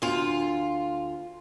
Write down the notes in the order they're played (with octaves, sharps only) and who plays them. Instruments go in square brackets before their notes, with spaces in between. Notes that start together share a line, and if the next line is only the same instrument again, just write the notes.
[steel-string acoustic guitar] D2 F4